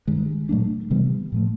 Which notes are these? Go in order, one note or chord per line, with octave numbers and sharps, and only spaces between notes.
G2 D#3 G#3
A#2 F#3 A3 D4
C3 E3 G3 B3
A2 F3 A3